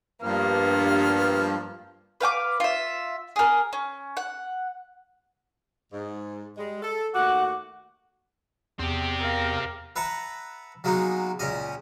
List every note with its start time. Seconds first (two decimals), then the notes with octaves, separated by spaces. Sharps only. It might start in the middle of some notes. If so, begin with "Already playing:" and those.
0.23 G2 F3 A#3 B3 F6
2.21 B4 F5 G5 D6
2.60 F4 E5
3.36 G#4 A#4
3.73 C#4
4.17 F#5
5.93 G#2
6.57 G3 G#3
6.83 A4
7.15 D#2 A3 F#4 F#5 D6 F#6
8.79 E2 C4 G4
9.20 A#4 F5
9.96 B4 E5 F#5 A5 A#5
10.84 F#3 G#3 A#3 B3 D#4 F#4
11.39 C#2 A#2 C#4 D#5